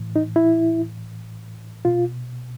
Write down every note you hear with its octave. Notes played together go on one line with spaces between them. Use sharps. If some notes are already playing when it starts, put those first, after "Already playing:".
Already playing: A2 E3
D#4
E4
B2 F4